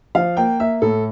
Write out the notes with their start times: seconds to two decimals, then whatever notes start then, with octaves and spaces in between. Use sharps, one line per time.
0.15 F3 F5
0.37 A#3 G5
0.60 A#3 E5
0.82 A2 A4